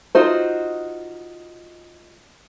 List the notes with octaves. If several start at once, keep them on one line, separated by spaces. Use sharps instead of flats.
D#4 F4 F#4 C5